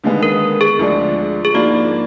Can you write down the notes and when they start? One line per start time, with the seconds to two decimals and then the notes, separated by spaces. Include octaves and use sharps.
0.04 D#2 D3 G#3 B3
0.23 A#4
0.61 G#4
0.79 D2 D3 F3 G#3 D4
1.45 G#4
1.54 G#2 F3 A#3 D4 F#4